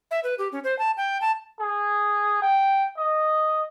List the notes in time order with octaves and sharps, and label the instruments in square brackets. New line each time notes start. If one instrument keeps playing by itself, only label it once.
[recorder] E5
B4
G4
C#4
C5
A5
G5
A5
[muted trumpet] G#4
G5
D#5